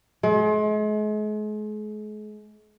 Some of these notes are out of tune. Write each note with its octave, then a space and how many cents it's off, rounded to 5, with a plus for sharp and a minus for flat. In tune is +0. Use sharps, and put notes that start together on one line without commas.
G#3 +40